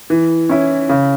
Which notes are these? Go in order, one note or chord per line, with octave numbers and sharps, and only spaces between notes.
E3
C#4 E4
C#3